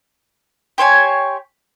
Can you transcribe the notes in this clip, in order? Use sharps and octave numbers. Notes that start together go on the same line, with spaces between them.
G4 C5 C#5 G#5